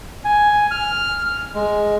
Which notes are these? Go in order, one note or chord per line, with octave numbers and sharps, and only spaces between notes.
G#5
F6
G#3